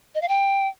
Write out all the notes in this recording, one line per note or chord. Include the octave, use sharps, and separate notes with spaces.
D#5
F5
G5